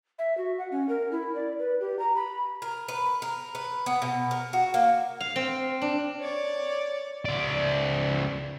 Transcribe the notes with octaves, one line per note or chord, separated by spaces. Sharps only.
E5
F#4
F#5
C#4
A#4
E4
D5
B4
G4
A#5
B5
A#4
B4
A#4
B4
B3
B2
A#4
F#4
A#3
F5
C4
D4
C#5 D5
C#2 D5